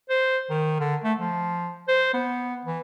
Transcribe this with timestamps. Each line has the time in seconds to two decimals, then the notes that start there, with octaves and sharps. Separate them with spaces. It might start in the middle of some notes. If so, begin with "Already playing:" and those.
0.10 C5
0.50 D#3
0.80 D3
1.04 A3
1.19 F3
1.88 C5
2.14 B3
2.65 E3